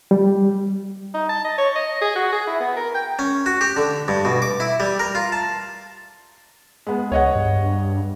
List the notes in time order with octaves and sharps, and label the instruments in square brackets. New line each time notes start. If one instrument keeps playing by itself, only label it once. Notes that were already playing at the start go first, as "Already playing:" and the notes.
[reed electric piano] G3
[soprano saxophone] D#4
A5
D#5
C#5
D#5
G#4
F#4
G#4
E4
B3
A#4
G5
[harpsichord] C#4
F#4
G4
D3
G2
B2
D6
E4
G3
A#4
F4
A5
[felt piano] G#3 B3
[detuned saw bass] C#2 [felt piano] C#5 D#5 F#5
[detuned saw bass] G2